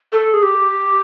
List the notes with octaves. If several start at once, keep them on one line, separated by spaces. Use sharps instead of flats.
A4
G#4
G4